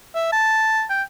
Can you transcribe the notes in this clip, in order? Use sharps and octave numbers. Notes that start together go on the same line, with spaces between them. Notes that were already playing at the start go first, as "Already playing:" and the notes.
E5
A5
G5